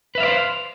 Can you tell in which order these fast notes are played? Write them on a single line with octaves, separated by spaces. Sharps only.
B4 E5 F5 D5 C5